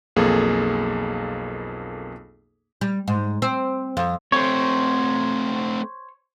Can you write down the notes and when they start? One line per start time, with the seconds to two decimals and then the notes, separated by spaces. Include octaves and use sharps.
0.16 B1 F2 A#3 G#4 A4
2.81 G3
3.08 G#2
3.42 C4
3.97 F2
4.32 A3 C4 C5 C#5